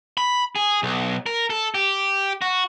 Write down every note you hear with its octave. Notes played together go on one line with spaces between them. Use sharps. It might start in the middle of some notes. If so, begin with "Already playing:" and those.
B5
G#4
B1
A#4
A4
G4
F#4